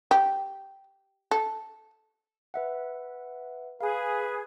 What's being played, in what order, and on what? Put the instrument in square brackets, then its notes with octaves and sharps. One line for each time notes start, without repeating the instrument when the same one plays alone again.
[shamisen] G4
A4
[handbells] B4 E5 F#5
[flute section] G#4 [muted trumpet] B4 [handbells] F5 G#5